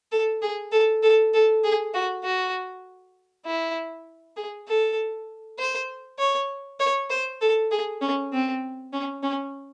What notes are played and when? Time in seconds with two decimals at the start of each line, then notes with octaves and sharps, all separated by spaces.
0.12 A4
0.42 G#4
0.72 A4
1.03 A4
1.34 A4
1.64 G#4
1.94 F#4
2.24 F#4
3.46 E4
4.37 G#4
4.68 A4
5.59 C5
6.19 C#5
6.80 C#5
7.10 C5
7.42 A4
7.71 G#4
8.02 C#4
8.33 C4
8.93 C#4
9.23 C#4